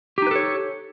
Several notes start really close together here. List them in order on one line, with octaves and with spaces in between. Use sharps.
G4 D#4 B4 A4 C#5